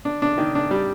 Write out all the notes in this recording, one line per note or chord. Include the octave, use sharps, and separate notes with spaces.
D4
D4
D#3
D4
G3